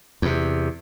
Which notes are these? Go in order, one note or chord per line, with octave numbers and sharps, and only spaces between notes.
E2 C3